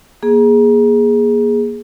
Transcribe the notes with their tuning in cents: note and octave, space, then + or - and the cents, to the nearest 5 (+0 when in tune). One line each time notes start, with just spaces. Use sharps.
A#3 +30 G#4 +0